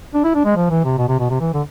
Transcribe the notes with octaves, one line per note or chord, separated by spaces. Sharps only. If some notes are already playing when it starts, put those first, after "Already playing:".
D4
E4
D4
G#3
F3
E3
C3
B2
C3
B2
C3
E3
D3